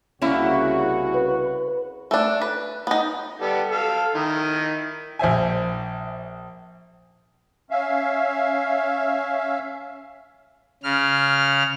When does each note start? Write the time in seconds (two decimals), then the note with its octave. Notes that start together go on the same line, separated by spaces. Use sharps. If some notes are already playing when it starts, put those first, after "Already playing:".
0.22 C2 C#3 A#3 C#4 E4 F#4
1.14 B4
2.11 A3 D4
2.41 B4
2.87 B3 D#4
3.41 G3 B3 A4
3.71 A4 F5
4.15 D#3 D#4 E4
5.19 A#1 C5 E5 G#5
7.71 C#4 E5 F5
10.83 C#3 F6